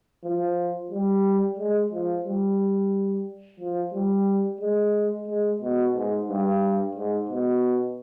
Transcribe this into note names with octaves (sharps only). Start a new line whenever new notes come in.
F3
G3
G#3
F3
G3
F3
G3
G#3
G#3
B2
G#2
G2
G#2
B2